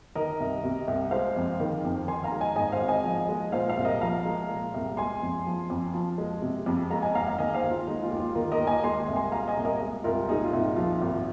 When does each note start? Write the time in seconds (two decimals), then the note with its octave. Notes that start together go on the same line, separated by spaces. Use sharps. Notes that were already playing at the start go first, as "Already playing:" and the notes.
0.15 D#3 A#4 D#5
0.40 C2
0.64 C3
0.88 C2
1.11 G#3 C5 F5
1.36 F2
1.60 D#3
1.85 F2
2.08 D#3 G#5 C6
2.24 F5 A#5
2.32 G#3
2.40 D#5 G#5
2.56 G#2 D#5 G#5
2.72 C5 F5
2.81 G#1
2.88 D#5 G#5
3.04 F3
3.29 G#3
3.52 A#2 C5 F5
3.68 C5 F5
3.77 C2
3.85 A#4 D#5
4.01 F3 F5 A#5
4.25 G#3
4.50 A#2
4.74 C2
4.97 G#3 G#5 C6
5.22 F2
5.47 F3
5.70 F2
5.94 F3
6.18 G#3
6.42 C3
6.66 F2
6.90 G#3 F5 A#5
7.02 D#5 G#5
7.14 D#2 F5 A#5
7.27 F5 A#5
7.38 D#3 D#5 G#5
7.55 C5 F5
7.64 D#2
7.71 F4
7.87 G#3 D#4
8.03 F4
8.11 D#2
8.20 F4
8.35 D#3 F4 A#4
8.52 A#4 D#5
8.59 D#2
8.67 D#5 G#5
8.83 G#3 G#5 C6
9.08 C2
9.16 G#5 C6
9.32 A#2 F5 A#5
9.48 D#5 G#5
9.57 C2
9.65 A#4 D#5
9.81 G#3
10.04 C2 F4 A#4
10.29 A#2 D#4 G#4
10.45 F4
10.53 C2
10.61 D#4
10.76 F3 F4
11.02 G#1